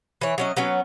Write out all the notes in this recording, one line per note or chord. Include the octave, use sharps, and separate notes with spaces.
E3 C#5
F#3 C#4 D#5
F#3 B3 C#4